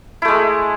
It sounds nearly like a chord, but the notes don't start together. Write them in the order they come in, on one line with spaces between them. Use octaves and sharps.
E4 A3 G#3